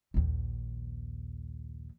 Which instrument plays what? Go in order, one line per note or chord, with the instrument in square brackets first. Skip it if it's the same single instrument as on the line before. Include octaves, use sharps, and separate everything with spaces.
[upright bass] A#1 D#2